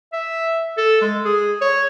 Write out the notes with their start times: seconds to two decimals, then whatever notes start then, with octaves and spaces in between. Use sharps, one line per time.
0.13 E5
0.78 A4
1.02 G#3
1.25 G#4
1.61 C#5